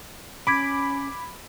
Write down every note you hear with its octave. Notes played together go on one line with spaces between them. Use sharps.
C#4 B5 D6 G#6 B6 D7